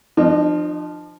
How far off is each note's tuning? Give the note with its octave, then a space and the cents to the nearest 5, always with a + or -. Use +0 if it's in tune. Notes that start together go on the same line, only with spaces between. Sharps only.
F3 +0 D4 +45 D#5 -10